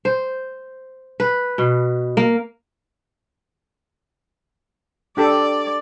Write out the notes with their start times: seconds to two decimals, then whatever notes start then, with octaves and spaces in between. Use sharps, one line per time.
0.05 C5
1.20 B4
1.58 B2
2.17 A#3
5.17 D4 G4 A4 D5